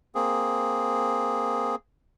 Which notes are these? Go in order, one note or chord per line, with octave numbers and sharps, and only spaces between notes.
A#3 C4 G#4